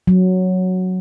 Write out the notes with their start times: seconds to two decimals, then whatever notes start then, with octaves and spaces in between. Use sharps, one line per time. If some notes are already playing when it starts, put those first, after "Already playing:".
0.07 F#3